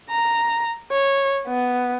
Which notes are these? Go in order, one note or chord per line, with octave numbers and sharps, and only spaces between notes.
A#5
C#5
B3